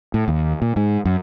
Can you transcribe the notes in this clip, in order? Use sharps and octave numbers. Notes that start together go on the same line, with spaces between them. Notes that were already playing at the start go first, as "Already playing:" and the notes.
A2
D#2
A#2
G#2
F#2